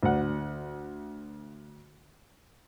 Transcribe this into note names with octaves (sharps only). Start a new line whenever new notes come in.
D2 F#5